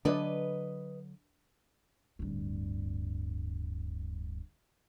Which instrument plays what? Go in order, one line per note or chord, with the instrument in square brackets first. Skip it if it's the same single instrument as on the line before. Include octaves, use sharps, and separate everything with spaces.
[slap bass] D3 F#3 [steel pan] D4 D5 [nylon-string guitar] B4 D#5
[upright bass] D1 G2